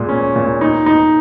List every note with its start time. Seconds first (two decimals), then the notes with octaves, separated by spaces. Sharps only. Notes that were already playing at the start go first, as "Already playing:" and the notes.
Already playing: A#2 G#3
0.09 C#4
0.36 A#2
0.61 D#4
0.86 D#4